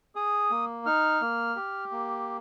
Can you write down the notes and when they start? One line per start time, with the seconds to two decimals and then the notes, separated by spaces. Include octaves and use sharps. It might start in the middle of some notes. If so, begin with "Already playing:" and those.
0.15 G#4 D#6
0.51 A#3
0.86 D#4 F6
1.21 A#3
1.56 G4
1.91 A#3